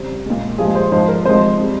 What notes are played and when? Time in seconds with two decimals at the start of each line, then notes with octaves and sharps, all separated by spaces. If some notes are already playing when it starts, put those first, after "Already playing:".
Already playing: F2 C#3 G3 C5
0.26 A#2 G#3
0.58 G2 F3 G#3 G#4
0.75 C5
0.92 G#2 F3 G#3 C5
1.08 A#4
1.25 C3 F3 G#3 C5
1.58 C3 G3